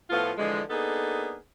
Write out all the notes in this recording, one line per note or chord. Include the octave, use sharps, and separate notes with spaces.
A2 F3 A3 B3 F4
D3 E3 F3 G#3
A#3 B3 D4 D#4 G#4 A4